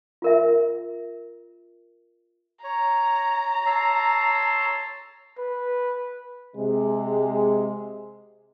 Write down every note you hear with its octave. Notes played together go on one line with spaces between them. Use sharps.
F4 A#4 E5
C#5 A#5
C#5 A5 C6 E6
B4
C3 G#3